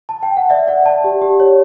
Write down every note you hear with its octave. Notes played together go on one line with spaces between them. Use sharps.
A5
G5
F#5
D5 E5
D5 F#5
D5 A5
G4
G4
C#5